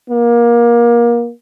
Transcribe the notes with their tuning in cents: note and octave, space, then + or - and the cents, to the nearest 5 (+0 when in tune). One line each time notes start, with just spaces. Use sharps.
A#3 +25